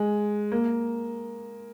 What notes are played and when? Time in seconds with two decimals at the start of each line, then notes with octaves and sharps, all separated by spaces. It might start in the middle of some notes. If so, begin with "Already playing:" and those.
Already playing: G#3
0.52 A#3